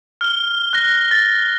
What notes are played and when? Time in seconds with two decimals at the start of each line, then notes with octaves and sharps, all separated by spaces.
0.21 F6 G7
0.73 F#6 A#6
1.11 A6